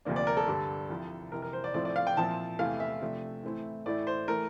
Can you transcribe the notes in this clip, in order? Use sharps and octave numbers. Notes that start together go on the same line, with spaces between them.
D2 C3 F3 A#3 D4
D5
A#4
A4
G2 D3 G3 D4
C2 C3 F3
F2 C3 E3 A#4
A#4
C5
D5
A2 F3 A3 C4 E4 D5
D5
F5
G5
A#2 F3 C4 E4 A5
E2 C3 E3 A3 E4 F5
E5
C3 F3 A3 D4
A2 E3 A3 C4 E4
A2 E3 A3 E4 D5
C5
E3 A3 A#4